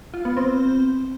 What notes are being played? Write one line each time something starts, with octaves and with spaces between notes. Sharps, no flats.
F4
B3
C4